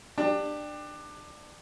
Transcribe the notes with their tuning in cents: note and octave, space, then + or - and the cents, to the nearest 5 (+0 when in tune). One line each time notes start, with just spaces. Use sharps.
D4 +20 G4 +15